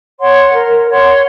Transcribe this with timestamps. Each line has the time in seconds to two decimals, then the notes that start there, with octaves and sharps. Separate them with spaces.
0.20 C#5 F#5 C6
0.53 A#4
0.88 C#5 F#5 C6